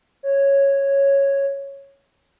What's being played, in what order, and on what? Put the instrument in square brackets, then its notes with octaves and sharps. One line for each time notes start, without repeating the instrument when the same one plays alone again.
[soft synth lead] C#5